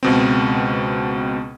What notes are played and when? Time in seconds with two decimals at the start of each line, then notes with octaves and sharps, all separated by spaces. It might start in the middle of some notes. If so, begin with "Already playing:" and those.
0.03 C#2 B2 C4